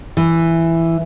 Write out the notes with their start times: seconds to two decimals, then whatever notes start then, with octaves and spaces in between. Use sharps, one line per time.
0.17 E3